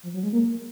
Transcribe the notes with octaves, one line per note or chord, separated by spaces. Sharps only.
F3
F#3
G#3
A#3